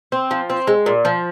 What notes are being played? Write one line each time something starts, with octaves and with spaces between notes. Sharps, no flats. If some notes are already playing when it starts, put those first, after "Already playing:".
C4
F3
C4
G#3
A#2
F3